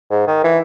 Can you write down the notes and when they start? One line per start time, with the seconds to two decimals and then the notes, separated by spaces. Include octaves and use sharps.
0.10 G#2
0.27 D#3
0.44 E3